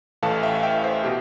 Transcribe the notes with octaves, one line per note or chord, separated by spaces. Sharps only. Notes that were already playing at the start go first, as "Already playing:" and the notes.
A1 A2 E3 A3 F5 A5
E5 G5
F5
E5 G5
C5 E5
B2 G4